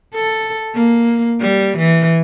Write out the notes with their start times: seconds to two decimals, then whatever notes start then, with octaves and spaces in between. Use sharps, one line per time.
0.14 A4
0.75 A#3
1.41 G3
1.78 E3